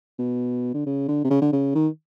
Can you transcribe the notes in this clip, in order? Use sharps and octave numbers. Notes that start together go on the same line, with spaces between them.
B2
D3
C#3
D3
C3
C#3
D3
C#3
D#3